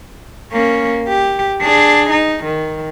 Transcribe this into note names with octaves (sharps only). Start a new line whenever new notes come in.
A#3 C#4
G4
D4 G#4
D#4
D#3